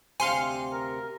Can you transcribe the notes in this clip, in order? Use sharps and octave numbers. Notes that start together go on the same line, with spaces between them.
D2 C3 C4 F5 G#5 C6 C#7
A#4